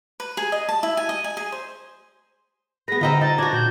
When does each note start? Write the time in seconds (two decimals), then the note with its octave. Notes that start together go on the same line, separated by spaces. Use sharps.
0.20 B4
0.37 G#4
0.52 D#5
0.69 A5
0.83 E4
0.97 G#5
1.09 D#5
1.24 G#5
1.37 G#4
1.52 C5
2.88 B3 G#4 B4 A#6
3.01 D3 C4 D#4 F4 A#6
3.21 D#4 A6
3.38 D4 F#4 G#6 A#6
3.53 A#2 C5 G6